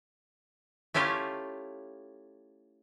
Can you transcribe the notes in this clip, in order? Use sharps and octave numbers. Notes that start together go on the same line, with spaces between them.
A3 C#4 E4 F4 G4